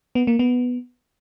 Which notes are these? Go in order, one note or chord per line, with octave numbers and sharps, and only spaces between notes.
B3
A#3
B3